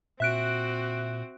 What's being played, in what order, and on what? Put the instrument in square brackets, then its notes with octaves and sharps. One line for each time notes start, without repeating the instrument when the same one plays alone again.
[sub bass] A#2 [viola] C4 F#4 [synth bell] E5 F#6 D7